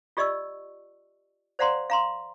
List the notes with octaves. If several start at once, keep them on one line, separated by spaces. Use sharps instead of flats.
F4 G4 D5 D#5 C#6 E6
C5 D5 F5 F#5 A#5 C6
F5 A#5 C6